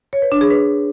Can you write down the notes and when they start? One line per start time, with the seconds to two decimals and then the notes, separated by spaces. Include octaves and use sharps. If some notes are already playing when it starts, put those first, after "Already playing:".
0.13 C#5
0.22 B4
0.32 D4
0.41 G#4
0.50 B4